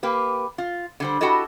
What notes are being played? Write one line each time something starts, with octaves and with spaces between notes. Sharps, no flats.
A#3 G4 B4
F4
D3 G3 C5
E4 F#4 G4 A4 D#5